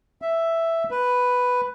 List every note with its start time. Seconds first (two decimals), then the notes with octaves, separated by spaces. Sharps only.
0.22 E5
0.91 B4